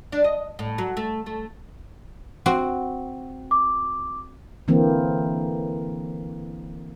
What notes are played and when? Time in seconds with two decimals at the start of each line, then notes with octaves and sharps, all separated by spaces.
0.12 D4
0.24 D#5
0.59 A2
0.78 F#3
0.97 A3
1.26 A3
2.46 C4 F#4
3.51 D6
4.68 D3 E3 A#3 C4